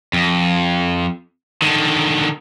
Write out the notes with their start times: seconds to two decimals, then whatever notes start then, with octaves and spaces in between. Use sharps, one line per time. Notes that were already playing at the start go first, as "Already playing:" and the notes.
0.13 F2
1.62 D3 D#3